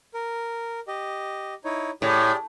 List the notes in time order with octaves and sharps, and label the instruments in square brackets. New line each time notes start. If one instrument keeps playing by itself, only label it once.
[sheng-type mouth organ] A#4
G4 D#5
D#4 E4 C#5
[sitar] A2 [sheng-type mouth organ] G4 G#4 D5